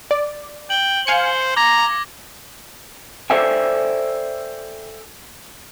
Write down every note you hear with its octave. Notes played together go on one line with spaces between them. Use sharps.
D5
G5 F#7 G7
C5 F5 G#5 C#7
A#5 D6 G#6 A#6
A4 C5 D5 E5 G5 G#5